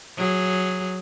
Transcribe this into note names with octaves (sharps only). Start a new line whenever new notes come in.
F#3 G#4